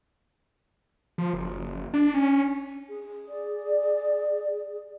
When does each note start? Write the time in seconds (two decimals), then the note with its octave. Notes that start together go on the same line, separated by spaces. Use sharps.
1.18 F3
1.34 F#1
1.94 D4
2.14 C#4
2.89 G#4
3.29 D5